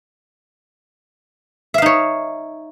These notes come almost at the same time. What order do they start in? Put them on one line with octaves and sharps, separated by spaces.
E5 F5 D#4 C#5